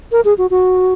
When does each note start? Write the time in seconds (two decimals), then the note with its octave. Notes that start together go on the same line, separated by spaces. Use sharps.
0.12 A#4
0.25 G#4
0.38 F#4
0.50 F#4